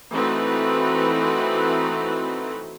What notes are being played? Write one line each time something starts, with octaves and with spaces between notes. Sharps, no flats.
E3 A3 C4 D#4 F#4 B4